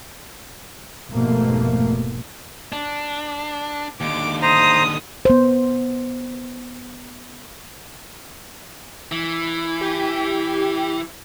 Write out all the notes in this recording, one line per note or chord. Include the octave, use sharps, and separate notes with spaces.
F1 G#2 B2 A3 A#3
D4
D#2 D3 D6
C5 A#5 D#6
B3 C5
E3
G4